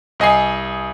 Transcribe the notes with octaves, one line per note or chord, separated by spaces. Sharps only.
C2 D#5 G#5 C7